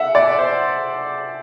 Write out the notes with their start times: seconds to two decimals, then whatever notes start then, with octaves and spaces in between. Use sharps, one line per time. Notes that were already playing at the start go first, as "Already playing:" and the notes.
Already playing: E5 F#5
0.15 D5
0.39 C5